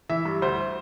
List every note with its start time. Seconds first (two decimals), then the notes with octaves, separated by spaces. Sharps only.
0.10 E3 E5
0.25 G2
0.42 D2 C5